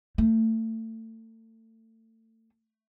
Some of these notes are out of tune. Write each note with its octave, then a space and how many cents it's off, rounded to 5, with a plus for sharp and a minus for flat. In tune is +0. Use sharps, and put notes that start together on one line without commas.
A3 +30